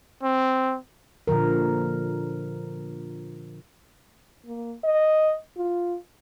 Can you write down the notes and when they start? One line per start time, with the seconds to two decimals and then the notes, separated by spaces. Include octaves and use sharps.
0.23 C4
1.27 A#2 D3 F3 A#4
4.46 A#3
4.84 D#5
5.57 F4